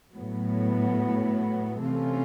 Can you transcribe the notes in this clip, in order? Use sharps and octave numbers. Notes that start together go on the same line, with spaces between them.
A2 F#3 B3
C3 E3 A3 C#4 F4